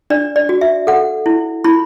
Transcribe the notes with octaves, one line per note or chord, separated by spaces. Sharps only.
D4 D5
D5
F#4
E5
A4 F#5
E4
E4 B5